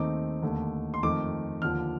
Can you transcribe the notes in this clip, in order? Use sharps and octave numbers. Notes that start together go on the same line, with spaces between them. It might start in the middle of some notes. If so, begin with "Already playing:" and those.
Already playing: D#2 D#3 A3 C4 D#4 D6
D#2 D3 A3
C6
F2 D#3 A3 D6
D#2 D3 F3 F6